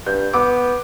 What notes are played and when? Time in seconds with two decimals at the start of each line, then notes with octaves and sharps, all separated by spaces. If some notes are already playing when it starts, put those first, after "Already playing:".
0.06 G2 G6
0.33 B3 D6